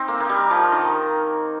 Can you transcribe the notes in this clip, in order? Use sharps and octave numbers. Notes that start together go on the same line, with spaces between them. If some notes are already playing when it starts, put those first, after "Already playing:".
Already playing: C4 D#4
A#3
A#3
G3
F3
D#3